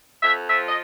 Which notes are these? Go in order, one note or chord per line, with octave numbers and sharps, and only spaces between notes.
F2 E5
F3 E5
D#5